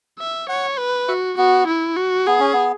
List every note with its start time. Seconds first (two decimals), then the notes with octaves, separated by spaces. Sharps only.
0.19 E5
0.49 C#5 F#5
0.78 B4
1.08 F#4 E5
1.37 B3 F#4
1.67 E4
1.96 F#4
2.26 B3 G#4
2.40 C#4
2.53 B3